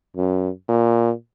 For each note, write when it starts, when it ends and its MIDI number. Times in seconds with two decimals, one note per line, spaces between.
0.16 0.49 42
0.69 1.12 46